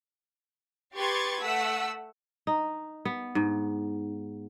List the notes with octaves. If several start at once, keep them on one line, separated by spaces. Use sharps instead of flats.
G4 B4 C6 C#6 G#6 A6
A3 F#5 E6 B6
D#4
B3
G#2